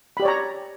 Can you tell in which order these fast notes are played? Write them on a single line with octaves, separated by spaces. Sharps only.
B5 G4 D5 C#5 A#5